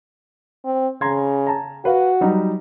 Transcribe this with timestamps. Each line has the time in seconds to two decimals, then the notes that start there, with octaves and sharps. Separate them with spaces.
0.65 C4
1.01 C#3 A#5 C6 G#6
1.47 A5 A#5
1.85 F#4 B4 F5
2.21 F#3 G3 D#4